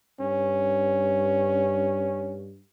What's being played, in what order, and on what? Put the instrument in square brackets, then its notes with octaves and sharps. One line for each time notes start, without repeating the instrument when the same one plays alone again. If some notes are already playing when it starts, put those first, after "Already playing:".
[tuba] G2 [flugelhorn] C#4